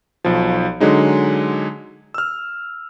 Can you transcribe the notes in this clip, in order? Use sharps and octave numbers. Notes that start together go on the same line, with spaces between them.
B1 F3
D3 F#3 G#3 D#4
E6 F6